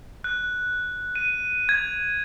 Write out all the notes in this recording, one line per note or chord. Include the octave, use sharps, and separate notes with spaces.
F#6
D#7
G#6